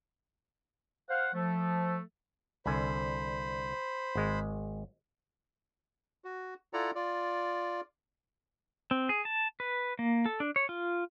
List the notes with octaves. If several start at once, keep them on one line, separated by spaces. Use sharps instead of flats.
C5 F5 F#5
F3 A3
C2 D3 C5 G#5 B5
G#1 G#3
F#4
E4 F4 A4 D5 F#5 A#5
F4 D5
C4
G#4
A5
B4
A#3
A4
D4
C#5
F4